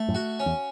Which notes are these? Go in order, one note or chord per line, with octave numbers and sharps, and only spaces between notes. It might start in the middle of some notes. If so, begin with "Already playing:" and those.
Already playing: A3
F#2 A2
F#4
C#4
E2